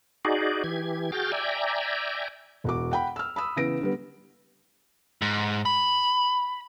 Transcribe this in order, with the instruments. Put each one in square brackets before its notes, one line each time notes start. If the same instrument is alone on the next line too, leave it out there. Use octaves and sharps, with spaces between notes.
[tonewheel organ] D#4 F#4 G#4 D5
E3 G4 G#6
F#4 G#4 G5 F6 G6 A6
D5 E5 G5 G#5 A#5
[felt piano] E1 F#4 D6
F#5 G5 B5
E6 F6
B5 D#6 E6
C#3 E3 B3 A#6 D7
D3 G3 B3
[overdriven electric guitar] G#2
B5